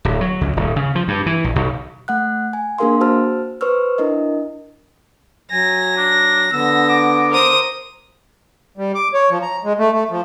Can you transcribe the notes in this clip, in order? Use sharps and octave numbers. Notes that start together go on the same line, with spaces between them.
D1
F#3
C#2
D1
C#3
F3
G2
E3
A#1
B1
A3 F#5 F#6
G#5
A#3 D4 G#4 A#4 F5 C6
F#4 C5 A5 E6 F6
B4 C5 C#6 E6 F6
D4 E4 A#4 D#5
F#3 G#5 A#6
D4
D3 B3 E6 A#6
D6
A#4 C5 D#6
G3
D6
C#5
F3
A#5
G#3
A3
A3
F3